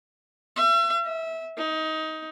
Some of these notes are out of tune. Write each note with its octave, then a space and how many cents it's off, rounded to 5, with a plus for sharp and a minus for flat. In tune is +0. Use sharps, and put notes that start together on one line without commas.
E5 +40
E5 -20
D#4 +20